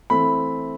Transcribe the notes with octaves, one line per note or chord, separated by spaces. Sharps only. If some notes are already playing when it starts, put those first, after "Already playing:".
E3 A3 C4 B5